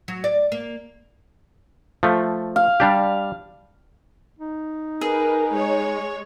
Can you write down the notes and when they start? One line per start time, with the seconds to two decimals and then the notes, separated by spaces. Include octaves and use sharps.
0.08 F#3
0.24 D5
0.52 A#3
2.03 F3 A3
2.56 F5
2.80 G3 D4 G4
4.39 D#4
5.01 G#4 A#4 B4
5.54 G#3 C#5